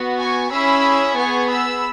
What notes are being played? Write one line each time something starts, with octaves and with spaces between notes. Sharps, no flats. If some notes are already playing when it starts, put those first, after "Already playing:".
Already playing: B3 F#4
G#5 C#6
C#4 E4 G#4 B5 E6
B3 G#4 G#5 C#6
B5 E6